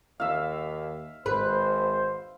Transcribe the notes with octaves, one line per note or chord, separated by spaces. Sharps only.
D#2 E5 F5
G#1 B4 C5